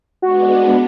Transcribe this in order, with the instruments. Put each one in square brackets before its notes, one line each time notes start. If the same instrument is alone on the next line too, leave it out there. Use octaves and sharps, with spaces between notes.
[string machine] G#3 B3 D4 [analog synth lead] F#4